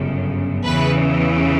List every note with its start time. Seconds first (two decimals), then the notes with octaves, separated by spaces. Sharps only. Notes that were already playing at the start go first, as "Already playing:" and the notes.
Already playing: G1 F#2 C#3
0.64 E2 C#3 E3 B4